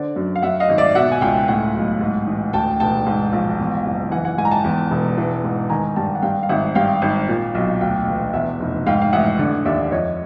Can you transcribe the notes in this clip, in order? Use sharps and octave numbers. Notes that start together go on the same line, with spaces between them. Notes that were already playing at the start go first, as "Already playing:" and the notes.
Already playing: D3 C5 D5
F#2
F5
F#2 E5 F#5
D#5 F5
G#1
D5 E5
B2 E5 F#5
G#5
C#2 F5 G5
A2 F#5 G#5
B1
G#2
A1
D2 G5 A5
E1 G5 A5
G#2
A#1
E2
F#1
E3 F#5 G#5
F#5 G#5
G#2 F#5 G#5
A#5
G5 A5
E2
E1
E3
G#2
D#3 G#5 A#5
G2 G5 A5
F#5
G2 F5 G5
F5
G#1 E5 F#5
G2 F5 G5
G#1
A#2
B1
D2 F5 G5
E1 F5 G5
E2 E5 F#5
F1
G#2 F5 G5
F5
A1 E5 F#5
D3
D#2 D5 E5
F2 C#5 D#5